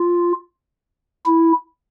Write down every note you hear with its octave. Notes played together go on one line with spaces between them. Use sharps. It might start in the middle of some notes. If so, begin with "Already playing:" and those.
Already playing: F4
E4